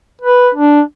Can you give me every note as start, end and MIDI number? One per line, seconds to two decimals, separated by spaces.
0.22 0.49 71
0.55 0.81 62